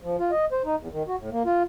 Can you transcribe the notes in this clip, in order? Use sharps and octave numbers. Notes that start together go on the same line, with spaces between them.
F3
F4
D#5
C5
D#4
E2
D#3
F#4
A2
A#3
F4